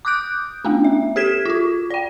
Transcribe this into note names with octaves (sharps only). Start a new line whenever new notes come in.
D6 D#6 F#6 G6 D7
A3 B3 C#4 D4
E5
G4 A4 G#6 B6 E7
F4 F#4
D5 G5